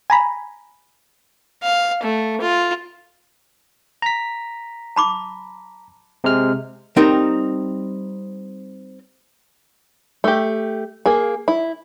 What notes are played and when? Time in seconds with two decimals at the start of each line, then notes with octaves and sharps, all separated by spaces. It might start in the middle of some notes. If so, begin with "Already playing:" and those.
0.10 G#5 A#5 B5
1.63 F5
2.03 A3
2.41 F4
4.02 A#5 B6
4.96 A5 B5 D6
6.24 C3 G#3 F6
6.96 G3 C4 D#4 A#4 G5
10.24 A3 G4
11.06 A#3 G#4
11.48 E4